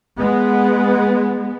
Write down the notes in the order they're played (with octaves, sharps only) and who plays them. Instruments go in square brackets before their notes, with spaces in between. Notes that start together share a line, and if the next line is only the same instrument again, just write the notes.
[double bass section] G#3 B3